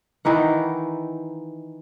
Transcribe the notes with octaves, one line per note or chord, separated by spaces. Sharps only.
D#3 E3 D#4 F#5